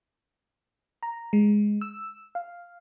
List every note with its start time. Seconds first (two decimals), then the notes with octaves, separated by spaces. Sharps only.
1.03 A#5
1.33 G#3
1.81 E6
2.35 F5